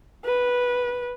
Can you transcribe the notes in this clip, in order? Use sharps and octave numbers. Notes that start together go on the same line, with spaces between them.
B4